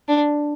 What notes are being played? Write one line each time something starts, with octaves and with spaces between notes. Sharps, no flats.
D4